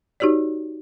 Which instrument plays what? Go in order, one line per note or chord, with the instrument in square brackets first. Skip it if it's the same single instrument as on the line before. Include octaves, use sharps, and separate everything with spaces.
[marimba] D#4 F#4 G4 C#5 D5